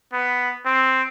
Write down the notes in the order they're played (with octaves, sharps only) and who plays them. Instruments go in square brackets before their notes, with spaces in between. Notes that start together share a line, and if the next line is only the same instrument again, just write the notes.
[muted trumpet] B3
C4